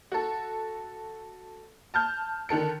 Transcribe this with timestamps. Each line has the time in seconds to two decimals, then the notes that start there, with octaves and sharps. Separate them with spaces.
0.12 F#4 A4
1.94 A5 F6 G6
2.49 D3 D#3 A4 C#7